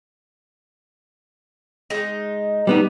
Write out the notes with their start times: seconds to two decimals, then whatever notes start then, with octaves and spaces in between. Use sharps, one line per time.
1.90 G#3 D#4
2.67 G3 B3 D#4